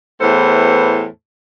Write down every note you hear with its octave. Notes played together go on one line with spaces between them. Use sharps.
E2 A2 E3 A4 C5